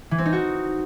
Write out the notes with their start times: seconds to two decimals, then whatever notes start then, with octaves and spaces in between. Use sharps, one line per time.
0.11 E3
0.18 C4
0.26 D#4
0.33 F#4